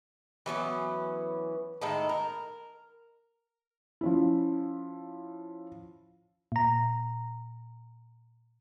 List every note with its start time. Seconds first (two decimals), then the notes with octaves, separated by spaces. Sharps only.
0.46 E3 F#3 B3 C#4
1.81 A2 D#3 G#3 A4
2.09 A#4
4.01 F3 C#4 E4
6.52 A#2 A#5